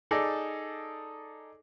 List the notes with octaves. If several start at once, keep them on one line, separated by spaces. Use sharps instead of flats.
D#4 G#4 A4 D5